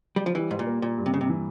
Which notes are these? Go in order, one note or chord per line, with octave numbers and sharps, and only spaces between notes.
G3
F3
E3 G3
G#2
A#2
A#3
A#2
G2
C3
C#3
C3
E3